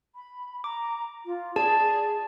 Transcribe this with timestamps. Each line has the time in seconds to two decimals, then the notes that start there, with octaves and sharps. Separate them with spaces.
0.16 B5
0.64 A#5 D6
1.26 F4
1.56 G#4 D5 A5